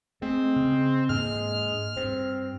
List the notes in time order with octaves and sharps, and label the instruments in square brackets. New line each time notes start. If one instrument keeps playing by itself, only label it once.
[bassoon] G#3 [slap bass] A3 [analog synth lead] C4
[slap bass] C#3
[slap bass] G#2 A#3 D4 [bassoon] G#3 [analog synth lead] F6
[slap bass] G2 [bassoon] C4